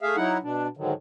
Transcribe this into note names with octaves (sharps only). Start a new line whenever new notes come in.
A3 G#4 E5 F5
F#3 D#4 E4 F#5
B2 D4
G#2 D3 D#3 F#3